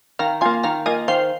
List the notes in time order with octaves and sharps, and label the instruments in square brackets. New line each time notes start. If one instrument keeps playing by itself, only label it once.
[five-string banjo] D#3 [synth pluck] F5 A#5
[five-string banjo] F4 [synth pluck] G#5 C6
[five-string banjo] A#3
[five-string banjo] D#3 [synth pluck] F5 A#5
[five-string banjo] A#3 F4 [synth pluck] D#5 G#5
[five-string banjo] D#3 [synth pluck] C5 F5